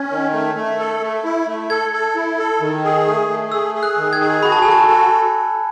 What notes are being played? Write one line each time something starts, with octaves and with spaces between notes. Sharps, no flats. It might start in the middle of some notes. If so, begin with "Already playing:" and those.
Already playing: C#4 G#6
D#3
A3
A3
A4
A3
E4
A3
A4 G#6
A4
E4
A4
D#3
G#4
A3
A3
G#4 E6
G#4
F#6
D#3
G#6
G#4
F#4 B5
A5
A4 G#5
A5
F#4